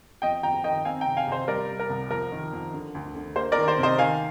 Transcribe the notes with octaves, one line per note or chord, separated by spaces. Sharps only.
F2 D#5 G5
F2 G5 A#5
D#3 D#5 G5
C4 F5 G#5
G5 A#5
C3
F5 G#5
C3 C5
G3 A#4 D5
G3
A#4
C2
F2 A#4
D#3
F2
D3
D2
D3
A#3 C5
A#4 D5
D#3
C5
C3
C5 D#5
D#3 F5 G#5